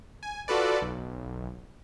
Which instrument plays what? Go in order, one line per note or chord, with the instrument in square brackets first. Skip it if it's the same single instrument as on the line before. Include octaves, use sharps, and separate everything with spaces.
[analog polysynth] G#5
F4 F#4 A4 B4 D5
B1